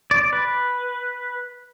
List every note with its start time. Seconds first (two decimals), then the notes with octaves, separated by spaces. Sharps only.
0.11 D5
0.33 B4